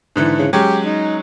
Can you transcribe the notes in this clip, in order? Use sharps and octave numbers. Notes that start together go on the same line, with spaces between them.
G#2 D3 E3
C#3
F#3 G#3 C#4 G4
D#4